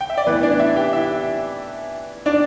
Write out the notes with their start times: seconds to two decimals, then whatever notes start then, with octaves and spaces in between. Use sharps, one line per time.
0.01 G5
0.10 E5
0.17 D5
0.26 A2 E3 B3 B4
0.43 D4 D5
0.59 E4 E5
0.76 G4 G5
0.93 E4 E5
2.26 D4 D5